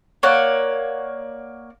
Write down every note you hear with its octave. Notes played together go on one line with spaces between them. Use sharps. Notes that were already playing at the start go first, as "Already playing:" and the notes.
A#3 C#5 D5 F#5